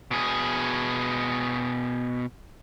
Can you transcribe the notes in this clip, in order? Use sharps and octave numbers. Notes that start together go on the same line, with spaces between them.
B2 G#4